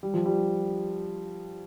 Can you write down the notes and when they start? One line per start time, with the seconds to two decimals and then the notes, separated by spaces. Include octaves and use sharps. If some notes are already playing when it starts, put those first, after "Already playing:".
0.03 G3
0.14 F3
0.26 G3